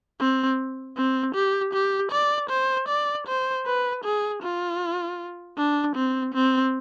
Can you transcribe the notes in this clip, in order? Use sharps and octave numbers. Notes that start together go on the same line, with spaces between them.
C4
C4
G4
G4
D5
C5
D5
C5
B4
G#4
F4
D4
C4
C4